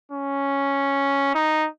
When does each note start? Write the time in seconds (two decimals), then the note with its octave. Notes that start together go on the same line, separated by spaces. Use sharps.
0.12 C#4
1.35 D#4